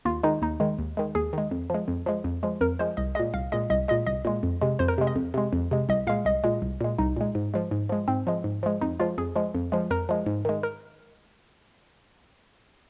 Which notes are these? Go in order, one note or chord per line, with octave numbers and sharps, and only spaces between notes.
D#2 F4
D#3 G#3 D#4
D#2 D#4
D#3 G#3
D#2
D#3 G#3
D#2 G#4
D#3 G#3
F2
F3 G#3
F2
F3 G#3
F2
F3 G#3
F2 A#4
F3 G#3 C5
C2 D#5
A#2 G#3 D#5
C2 F5
A#2 G#3 D#5
C2 D#5
A#2 G#3 D#5
C2 D#5
A#2 G#3
F2
C3 G#3
F2 C5
A#4
C3 G#3
D#5
F2
C3 G#3
F2
C3 G#3
C2 D#5
A#2 G#3 F5
C2 D#5
A#2 G#3
C2
A#2 G#3
C2 D#4
A#2 G#3
G#2
F3 G#3
G#2
F3 G#3
G#2 C4
F3 G#3
G#2
F3 G#3
F2 D#4
F3 G#3 F4
F2 G#4
F3 G#3
F2
F3 G#3
F2 A#4
F3 G#3
G#2
D#3 G#3
A#4